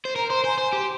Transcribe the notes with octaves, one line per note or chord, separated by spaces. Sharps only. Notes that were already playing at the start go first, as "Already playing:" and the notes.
C5
A#4 A#5
C5 A#5
C5 G#5
C5
G4